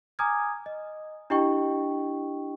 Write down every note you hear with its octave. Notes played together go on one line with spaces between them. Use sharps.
G#5 A#5 D6 D#6 F6 G#6
D#5
D4 E4 G4 D#5 G5 C#6